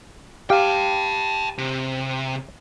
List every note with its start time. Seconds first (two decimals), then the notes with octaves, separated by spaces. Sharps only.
0.50 G4 F5 G5 A5
1.58 C3